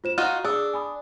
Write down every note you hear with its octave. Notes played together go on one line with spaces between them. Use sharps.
F4 C5 E7
D#4 F4 F#4 D#7
D4 G#4 D#6 E6
G#5 B5 D#6